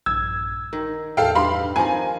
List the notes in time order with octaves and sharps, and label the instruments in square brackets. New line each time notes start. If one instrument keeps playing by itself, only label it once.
[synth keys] A#1 G2 [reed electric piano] E6 [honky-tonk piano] G#6
[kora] D#3 [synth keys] A#4
[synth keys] E2 A2 [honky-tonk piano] A4 F5 G5
[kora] G2 [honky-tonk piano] F5 B5 C6
[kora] D#3 F3 A#3 [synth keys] C4 [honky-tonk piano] G#5